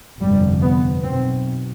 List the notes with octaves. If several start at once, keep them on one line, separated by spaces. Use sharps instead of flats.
G1 F2 C3 G3
B3
B1 B2 C4